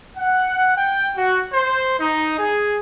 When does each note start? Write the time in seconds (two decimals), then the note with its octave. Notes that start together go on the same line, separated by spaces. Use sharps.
0.17 F#5
0.76 G5
1.16 F#4
1.53 C5
1.99 D#4
2.38 G#4